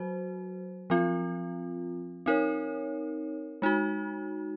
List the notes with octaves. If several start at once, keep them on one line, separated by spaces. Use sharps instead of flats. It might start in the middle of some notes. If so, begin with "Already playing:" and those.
Already playing: F#3 F#4 C5
F3 C4 F4
C4 D#4 A#4 C#5
G#3 D#4 F#4